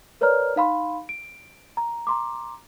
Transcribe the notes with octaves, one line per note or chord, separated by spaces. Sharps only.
A#4 B4 C#5 D5 A#5 F6
D#4 F5 B5 C6
D7
A#5
A#5 C6 D6